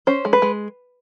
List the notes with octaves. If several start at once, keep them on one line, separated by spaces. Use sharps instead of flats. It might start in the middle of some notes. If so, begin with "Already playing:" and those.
C#4 C5
G#3
B4
G#3